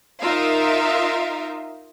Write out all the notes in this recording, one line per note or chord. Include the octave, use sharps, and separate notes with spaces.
D#4 F4 A#4 E5 F5